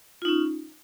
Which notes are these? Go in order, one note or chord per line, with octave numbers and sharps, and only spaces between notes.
C#4 D#4 F4